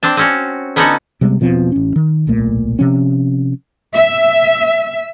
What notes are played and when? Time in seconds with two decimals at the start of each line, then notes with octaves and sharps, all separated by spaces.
0.03 C4 D4 A5
0.17 C4 C#4 F#4
0.76 D3 B3 C#4 D#4 F#4 A4
1.21 C3 G3 G#3 B3
1.40 E1 B2 F3 C4
1.72 A1 C#4
1.96 D#3
2.27 D1 B1 A#2 A3
2.79 C3 F3 C#4
3.95 E5